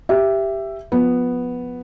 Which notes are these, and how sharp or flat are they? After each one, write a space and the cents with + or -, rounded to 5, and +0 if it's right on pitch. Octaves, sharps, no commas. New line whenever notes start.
G4 +0 E5 +10
F3 +25 B3 +0